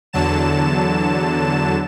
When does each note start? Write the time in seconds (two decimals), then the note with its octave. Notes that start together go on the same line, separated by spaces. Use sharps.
0.13 E2 D3 F#3 A5 E7